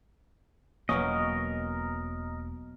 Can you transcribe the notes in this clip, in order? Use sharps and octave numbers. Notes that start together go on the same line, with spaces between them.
E1 B2 F#3 A#3 C#4 A#4 D#5